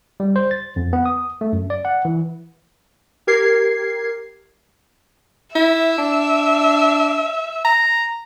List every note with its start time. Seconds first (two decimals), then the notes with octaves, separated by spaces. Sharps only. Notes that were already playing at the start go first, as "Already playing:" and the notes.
0.20 G3
0.36 C5
0.51 A6
0.76 F2
0.93 B3
1.06 D#6
1.41 A3
1.53 F#2
1.70 D5
1.85 F#5
2.05 E3
3.27 G4 A#4 G#6 C7
5.55 E4 E5
5.98 D4
7.65 A#5